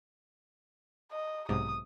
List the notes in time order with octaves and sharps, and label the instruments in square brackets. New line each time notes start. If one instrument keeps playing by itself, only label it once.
[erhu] D#5
[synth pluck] B1 G#2 C3 [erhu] D#6